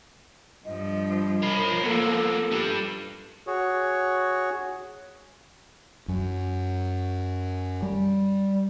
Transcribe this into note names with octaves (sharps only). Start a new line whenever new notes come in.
G2 F3 D#5
F3 A#4 C#5 B5
A#3 B3 A4
D4 G4
F#4 G#4 C#5
F#2
G3